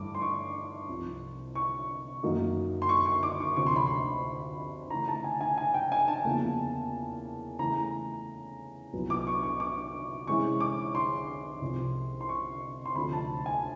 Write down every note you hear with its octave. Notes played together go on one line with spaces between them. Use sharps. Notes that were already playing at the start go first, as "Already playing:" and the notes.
Already playing: G2 E3 A3 D6
C6
C#6
C2 C3 F3
C#6
F#2 D#3 F#3 A#3 D#4
C6
C#6
C#6
D6
C#6
D2 C3 F3 C#6
C6
B5
C6
C#3 E3 A3 A#5
A5
G#5
G#5
G#5
G5
G#5
A5
E2 C#3 F3 A#3
C#3 E3 A3 A#5
C2 A#2 F#3 B3 E4
D6
D6
C#6
C#6
D6
C3 E3 G#3 C#4 E4 C#6
D6
C6
C2 C3 F3
C6
C#6
C6
D2 C3 F3 A3 D4 B5
A5
G#5